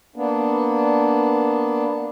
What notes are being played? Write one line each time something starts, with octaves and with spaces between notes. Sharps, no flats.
A#3 B3 D4